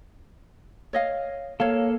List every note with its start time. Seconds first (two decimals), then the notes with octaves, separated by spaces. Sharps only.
0.93 C#5 D#5 F5
1.60 A#3 A4 C#5 F5